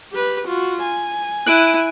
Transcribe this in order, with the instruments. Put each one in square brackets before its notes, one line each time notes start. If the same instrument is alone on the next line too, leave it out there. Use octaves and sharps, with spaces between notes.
[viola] G4 B4
F4 F#4
G#5
[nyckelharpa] E4 [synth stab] F#6 D7 D#7